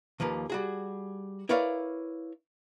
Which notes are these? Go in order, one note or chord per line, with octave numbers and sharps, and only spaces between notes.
D#2 F3 A#3 B4
G3 F#4 G#4
E4 A#4 B4 C#5 D5 F5